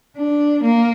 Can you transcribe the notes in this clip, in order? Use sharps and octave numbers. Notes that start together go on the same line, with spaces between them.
D4
A#3